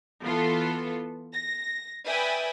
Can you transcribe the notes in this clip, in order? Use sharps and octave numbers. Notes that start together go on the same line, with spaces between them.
E3 B3 F4 A4
A#6
B4 D5 E5 G5 G#5 D#6